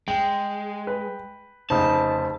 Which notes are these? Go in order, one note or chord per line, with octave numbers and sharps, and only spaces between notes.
G#3 G5
B4
F1 C#3 D#4 C5 A5